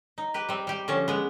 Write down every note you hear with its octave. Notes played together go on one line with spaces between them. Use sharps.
D#4
G4 B4
G3 C4
G3 G4
D3 F3 C#4
G#3 B3